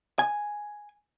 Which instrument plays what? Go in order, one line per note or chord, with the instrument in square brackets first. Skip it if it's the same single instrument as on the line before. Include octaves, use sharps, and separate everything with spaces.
[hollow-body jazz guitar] G#5